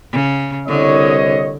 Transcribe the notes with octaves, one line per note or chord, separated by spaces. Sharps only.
C#3
C2 D3 C#5 D#5